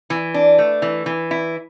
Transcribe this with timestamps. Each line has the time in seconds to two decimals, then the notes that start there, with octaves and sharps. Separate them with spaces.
0.10 E3
0.34 D4
0.58 A3
0.82 E3
1.06 E3
1.31 E4